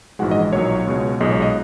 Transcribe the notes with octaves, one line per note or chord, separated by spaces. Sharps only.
A#1 G#2 E3 G#3 F#4 F#5
D#5
B1 A#2 F#3 C#5
C#2 B2 G#3
B1 A#2 G#3 D#5
C#5
D#5